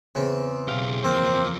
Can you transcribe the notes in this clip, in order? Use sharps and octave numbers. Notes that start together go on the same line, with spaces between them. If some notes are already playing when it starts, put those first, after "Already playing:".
E2 C#3 C4
B1 G4 F5
E2 F3 A#3 C4